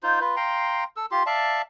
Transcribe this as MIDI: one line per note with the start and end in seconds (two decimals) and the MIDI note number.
0.03 0.20 63
0.03 0.20 65
0.03 0.20 72
0.21 0.35 65
0.21 0.35 71
0.36 0.84 77
0.36 0.84 79
0.36 0.84 82
0.36 0.84 84
0.97 1.06 69
0.97 1.06 88
1.11 1.23 65
1.11 1.23 67
1.11 1.23 84
1.26 1.62 74
1.26 1.62 76
1.26 1.62 77
1.26 1.62 81